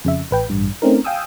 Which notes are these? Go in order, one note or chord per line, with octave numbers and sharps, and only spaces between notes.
F2 C#3 E5
A1 B4 G5
A1 G2
A3 C4 C#4 D#4 A#4
F5 G5 G#5 D#6 E6